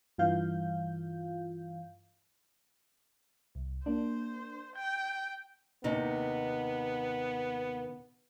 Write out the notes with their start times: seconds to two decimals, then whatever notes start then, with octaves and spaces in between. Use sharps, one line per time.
0.18 G2 E3 F4 F5 G6
3.55 C2
3.86 A#3 D4 C5
4.76 G5 G6
5.84 D#2 C3 B3 D#4